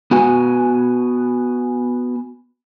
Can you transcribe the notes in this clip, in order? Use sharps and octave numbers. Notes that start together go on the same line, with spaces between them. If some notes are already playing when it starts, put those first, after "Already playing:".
B3 F#4 G#5